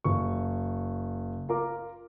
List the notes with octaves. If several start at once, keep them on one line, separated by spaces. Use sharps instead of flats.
F#1 C#6
F4 A#4 D6